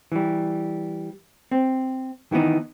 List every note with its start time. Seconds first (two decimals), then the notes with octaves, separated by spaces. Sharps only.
0.12 E3 G3
1.51 C4
2.31 D#3 E3 G3 B3 D#4